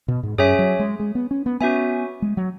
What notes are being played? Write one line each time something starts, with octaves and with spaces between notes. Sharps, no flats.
B2
G#2
F#2 C#4 G#4 C#5 E5 G#5
F#3
G#3
G#3
B3
C#4
B3
B3 C#4 F#4 E5 G#5
G#3
F#3